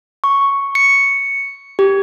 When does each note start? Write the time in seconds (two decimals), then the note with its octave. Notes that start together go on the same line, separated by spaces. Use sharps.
0.24 C#6
0.75 C#7
1.79 G4